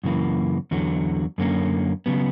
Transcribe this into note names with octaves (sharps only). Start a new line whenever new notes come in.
F#2 C#3 E3 A#3
E2 D3 F#3
F#2 D3 A#3 C#4
C#3 F#3 B3